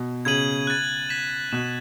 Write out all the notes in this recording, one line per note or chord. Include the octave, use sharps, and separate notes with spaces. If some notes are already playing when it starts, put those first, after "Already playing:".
Already playing: B2
C#3 G#6 D#7 F#7
F#6 A6 D#7
G#6 B6 E7
B2 F#6 B6 E7